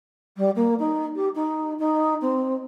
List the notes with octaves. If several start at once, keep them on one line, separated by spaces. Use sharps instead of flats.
G3
A#3
D#4
G4
D#4
D#4
C4